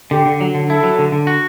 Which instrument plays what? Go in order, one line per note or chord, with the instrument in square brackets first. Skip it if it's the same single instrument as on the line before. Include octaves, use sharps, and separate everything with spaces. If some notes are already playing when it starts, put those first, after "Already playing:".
[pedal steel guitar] D3 [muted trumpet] G4
[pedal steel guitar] D3
F#3
D3
[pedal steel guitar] E4 [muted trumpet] A4
[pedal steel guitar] F#3
D3
D3
F#4